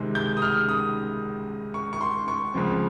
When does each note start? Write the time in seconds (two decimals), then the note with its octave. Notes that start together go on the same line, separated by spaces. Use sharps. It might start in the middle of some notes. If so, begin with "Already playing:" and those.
Already playing: C#2 C3 D#3 G#3
0.15 G6
0.37 D#6
0.42 F6
0.69 D#6
1.74 C#6
1.93 C#6
2.01 C6
2.28 C#6
2.54 C#2 C#3 F3 C4